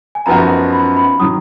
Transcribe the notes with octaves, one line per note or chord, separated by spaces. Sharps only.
G#5
F#2 F3 B3 D#4 F#4 A#5
B5
B5
D#3 F#3 D#6